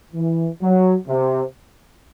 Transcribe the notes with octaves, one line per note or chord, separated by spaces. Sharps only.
E3
F#3
C3